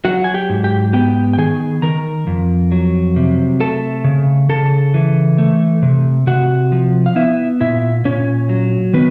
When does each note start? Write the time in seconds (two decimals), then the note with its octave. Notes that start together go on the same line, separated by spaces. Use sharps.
0.05 F#3 F#4 F#5
0.24 G#5
0.34 G4 G5
0.50 G#2
0.64 G4 G5
0.93 B3 G4 G5
1.33 G5
1.38 D#3 G#4 G#5
1.82 D#3 A#4 A#5
2.27 F2
2.72 F#3
3.16 C3
3.60 A3 A4 A5
4.04 C#3
4.49 C#3 A4 A5
4.94 E3
5.38 A3
5.83 C3
6.27 C3 F#4 F#5
6.72 F3
7.06 F5
7.16 B3 E4 E5
7.61 A#2 E4 E5
8.05 A#2 C#4 C#5
8.49 F#3
8.93 D#3 B3 B4